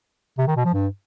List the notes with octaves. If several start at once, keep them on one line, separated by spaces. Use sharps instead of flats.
C3
D#3
B2
F3
G2